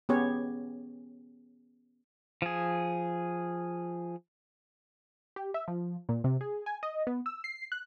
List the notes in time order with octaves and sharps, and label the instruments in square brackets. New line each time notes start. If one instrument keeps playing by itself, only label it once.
[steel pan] B3 C#4 G4 G#4 C#5
[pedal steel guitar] F3 G#4
[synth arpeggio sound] G4
E5
F3
A#2
C3
G#4
G#5
D#5
B3
E6
C7
F#6